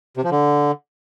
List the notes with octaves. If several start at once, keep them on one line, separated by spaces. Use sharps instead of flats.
C3
F3
D3